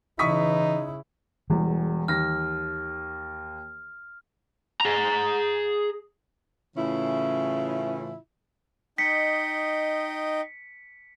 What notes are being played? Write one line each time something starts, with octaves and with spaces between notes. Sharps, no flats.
C#3 E3 D#4 E4 C#6 D#6 B6
E1 E2 E3 G3
D#2 F6 A#6
G#4 A#5
A2 C#3 E3 C#4 E4 F4
D#4 D#5 G5 B6 C#7